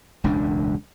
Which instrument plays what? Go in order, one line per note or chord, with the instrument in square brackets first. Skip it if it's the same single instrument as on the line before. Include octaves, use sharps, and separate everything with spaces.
[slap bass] E1 C#2 F#2 D4